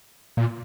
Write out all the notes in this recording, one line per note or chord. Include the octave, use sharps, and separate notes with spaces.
A#2